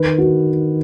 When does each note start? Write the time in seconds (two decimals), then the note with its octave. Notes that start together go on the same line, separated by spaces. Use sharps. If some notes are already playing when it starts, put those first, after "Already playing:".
Already playing: D#3 B4
0.18 F#4